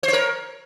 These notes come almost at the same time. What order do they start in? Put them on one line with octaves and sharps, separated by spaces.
C5 C#5 A#4